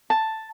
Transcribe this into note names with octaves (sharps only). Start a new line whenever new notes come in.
A5